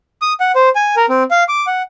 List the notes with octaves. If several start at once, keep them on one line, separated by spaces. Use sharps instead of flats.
D#6
F#5
C5
G#5
A#4
C4
F5
D6
F#5